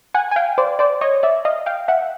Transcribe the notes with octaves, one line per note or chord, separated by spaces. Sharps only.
F#5 G#5
G#5
F5 G5
C5 D5
C5 D5
C#5 D#5
D5 E5
D#5 F5
F5 G5
E5 F#5